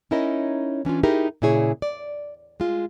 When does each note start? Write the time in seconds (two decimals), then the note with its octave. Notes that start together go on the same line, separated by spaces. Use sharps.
0.11 C#4 D#4 E4 A#4 C#5 D#5
0.85 E3 C#4 D4 F4
1.03 D#4 E4 G4 G#4 A#4
1.42 A#2 C#3 E4 G#4 C#5
1.82 D5
2.60 G#3 F4